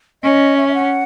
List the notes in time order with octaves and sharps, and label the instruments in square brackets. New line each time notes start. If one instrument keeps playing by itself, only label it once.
[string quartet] C#4 [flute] D#5
[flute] E5
E5
F#5